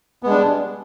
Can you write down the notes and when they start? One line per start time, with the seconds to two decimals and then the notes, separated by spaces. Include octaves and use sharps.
0.23 B3
0.26 G#3
0.30 D4
0.33 G3